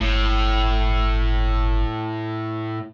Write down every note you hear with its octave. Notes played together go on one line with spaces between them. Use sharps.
G1 A2